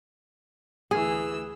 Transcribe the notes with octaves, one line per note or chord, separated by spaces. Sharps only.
D2 E3 G#4 E6